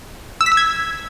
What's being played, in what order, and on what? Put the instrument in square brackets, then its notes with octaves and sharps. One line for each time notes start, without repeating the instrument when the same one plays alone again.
[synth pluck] E6
B6
E6
G#6